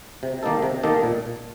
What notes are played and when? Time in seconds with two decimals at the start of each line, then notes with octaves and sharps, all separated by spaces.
0.23 C3
0.43 D#3 A#3 D#4 A4
0.62 C3
0.83 D#3 A#3 D#4 A4
1.03 A#2